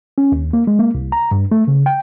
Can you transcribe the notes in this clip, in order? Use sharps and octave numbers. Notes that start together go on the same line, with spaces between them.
C#4
D#2
A#3
G#3
A#3
C2
A#5
G2
A3
C#3
G5